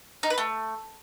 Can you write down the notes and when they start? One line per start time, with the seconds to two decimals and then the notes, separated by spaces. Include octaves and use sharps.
0.23 D#4
0.30 B4
0.38 A3